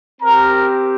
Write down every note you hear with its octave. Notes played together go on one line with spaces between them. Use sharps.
C4 G4 A#4 A#5